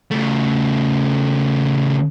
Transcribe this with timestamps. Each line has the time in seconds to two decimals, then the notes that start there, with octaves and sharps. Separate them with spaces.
0.11 C#3 A3